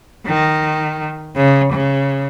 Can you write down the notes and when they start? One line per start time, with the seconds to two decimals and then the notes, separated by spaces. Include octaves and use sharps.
0.27 D#3
1.36 C#3
1.73 C#3